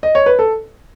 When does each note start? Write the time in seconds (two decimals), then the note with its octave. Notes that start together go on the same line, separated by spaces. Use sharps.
0.03 D#5
0.15 C#5
0.26 B4
0.39 A4